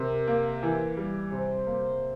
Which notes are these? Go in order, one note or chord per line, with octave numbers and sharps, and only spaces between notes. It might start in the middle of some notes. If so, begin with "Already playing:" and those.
Already playing: C3 A#4
A#3
E3
G3
C3 C5
A#3